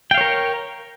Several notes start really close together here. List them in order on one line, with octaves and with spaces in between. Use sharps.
G5 F5 C#5 A#4